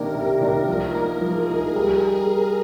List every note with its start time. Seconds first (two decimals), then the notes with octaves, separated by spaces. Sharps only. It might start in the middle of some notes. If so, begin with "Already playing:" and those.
Already playing: C3 D#3 A#3 D4 A#4
0.15 C3
0.41 D#3 A#3 D4
0.68 F3 A#4
0.95 A#3 D#4
1.21 F3 G#4
1.48 A#3 D#4
1.75 G3